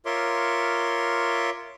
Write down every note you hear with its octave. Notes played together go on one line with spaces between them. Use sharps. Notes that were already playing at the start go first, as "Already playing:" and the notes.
F4 A#4 C#5 E5 C6 D6